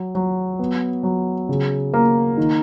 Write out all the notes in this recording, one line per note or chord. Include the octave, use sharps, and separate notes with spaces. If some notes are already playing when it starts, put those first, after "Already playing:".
Already playing: F#3
F#3
B3
F#3
C#3
A#3
D#3